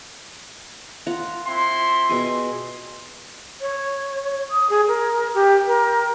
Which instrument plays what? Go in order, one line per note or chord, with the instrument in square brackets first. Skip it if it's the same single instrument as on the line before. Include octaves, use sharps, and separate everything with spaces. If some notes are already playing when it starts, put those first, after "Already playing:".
[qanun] F4 F#5 A#5
[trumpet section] C4 E4 C6
[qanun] B2 G#4 G#5
[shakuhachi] C#5
D#6
G#4
A#4
G4
A#4